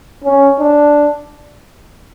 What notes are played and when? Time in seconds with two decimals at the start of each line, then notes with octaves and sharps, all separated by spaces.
0.24 C#4
0.59 D4